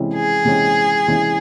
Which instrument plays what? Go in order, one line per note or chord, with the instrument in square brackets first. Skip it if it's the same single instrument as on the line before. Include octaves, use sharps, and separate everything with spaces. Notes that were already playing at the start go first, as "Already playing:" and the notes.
Already playing: [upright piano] C3 E3 G#3 C#4 E4
[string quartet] G#4
[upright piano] C3 E3 G#3 C#4 E4
C3 E3 G#3 C#4 E4